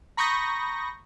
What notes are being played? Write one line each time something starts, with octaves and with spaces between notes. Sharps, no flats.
A#5 B5 C#6 D#6 G6 A#6